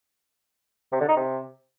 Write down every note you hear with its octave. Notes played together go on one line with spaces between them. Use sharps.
C3
D3
D#4
C3